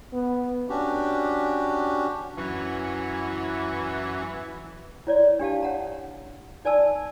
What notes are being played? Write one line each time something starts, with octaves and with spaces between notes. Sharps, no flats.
B3
C#4 D4 F#4 G4
F#2 E3 F#3 C#4
E4 C#5 D5
D4 G4 F5 A5
C#5 F#5 A#5
D#4 D5 G#5 A5 E6